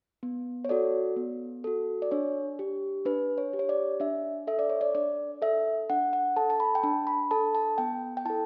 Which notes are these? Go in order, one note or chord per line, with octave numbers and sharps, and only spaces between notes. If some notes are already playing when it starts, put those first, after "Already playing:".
B3
C#5
F#4 A4 D5
B3
F#4 A4
D5
D4 C#5
G4
D4 B4
C#5
G4
C#5
D5
D4 E5
A4 E5
D5
C#5
D5
D4 D5
A4 E5
D4 F#5
F#5
A4 A5
A5
B5
G5
D4 A5
B5
A4 A5
A5
B3 G5
G5
E4 A4 A5